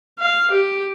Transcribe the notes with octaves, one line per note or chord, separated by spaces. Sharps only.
F5
G4